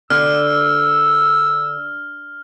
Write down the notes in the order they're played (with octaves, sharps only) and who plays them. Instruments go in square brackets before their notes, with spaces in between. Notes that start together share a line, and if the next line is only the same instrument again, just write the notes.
[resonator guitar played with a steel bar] D3 [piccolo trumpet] E6 [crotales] F6